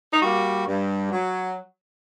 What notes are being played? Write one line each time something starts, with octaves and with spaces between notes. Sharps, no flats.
D#4
G3 A#3 F#4
G2
F#3